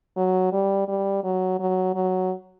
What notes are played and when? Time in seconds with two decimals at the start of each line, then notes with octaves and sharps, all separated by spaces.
0.17 F#3
0.52 G3
0.88 G3
1.24 F#3
1.59 F#3
1.94 F#3